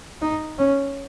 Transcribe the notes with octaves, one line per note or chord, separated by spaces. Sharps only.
D#4
C#4